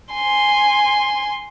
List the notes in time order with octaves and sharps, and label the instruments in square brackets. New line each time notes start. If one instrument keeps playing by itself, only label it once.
[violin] G#5 C6